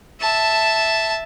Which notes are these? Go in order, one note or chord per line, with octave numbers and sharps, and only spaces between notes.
E5 A5